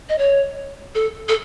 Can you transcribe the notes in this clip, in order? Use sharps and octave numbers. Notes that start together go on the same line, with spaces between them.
D#5
C#5
A4
A4